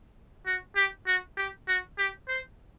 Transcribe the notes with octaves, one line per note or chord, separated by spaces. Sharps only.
F#4
G4
F#4
G4
F#4
G4
C5